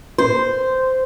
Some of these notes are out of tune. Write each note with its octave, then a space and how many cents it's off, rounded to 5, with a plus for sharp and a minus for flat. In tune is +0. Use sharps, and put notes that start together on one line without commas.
C5 -10